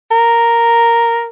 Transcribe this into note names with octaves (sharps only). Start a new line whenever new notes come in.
A#4